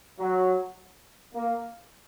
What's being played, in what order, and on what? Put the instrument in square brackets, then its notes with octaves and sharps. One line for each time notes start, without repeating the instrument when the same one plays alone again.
[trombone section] F#3
A#3